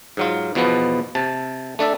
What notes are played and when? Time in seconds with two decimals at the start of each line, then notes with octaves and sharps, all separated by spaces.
0.17 G#2 F#3 F4
0.55 E2 B2 F3 B3
1.15 C3 A5
1.79 A3 D4 D5 E5